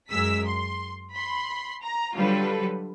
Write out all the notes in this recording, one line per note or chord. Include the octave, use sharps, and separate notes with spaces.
F#2 G#3 A#4 E6 B6
C6
B5 C6
A#5
D3 F#3 G3 F4 A4 B4